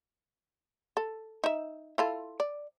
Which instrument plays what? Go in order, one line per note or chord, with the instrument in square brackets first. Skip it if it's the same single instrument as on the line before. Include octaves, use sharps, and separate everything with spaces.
[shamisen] A4
D#4 E5
E4 F4 A4
D5